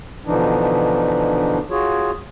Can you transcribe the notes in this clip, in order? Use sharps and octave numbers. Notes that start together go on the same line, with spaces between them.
B2 D3 E3 F3 D4 D#4
F4 F#4 G#4 C#5